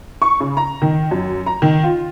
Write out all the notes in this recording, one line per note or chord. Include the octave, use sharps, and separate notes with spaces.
C#6
C#3
A#5
D#3
F#2
A#5
D#3
F4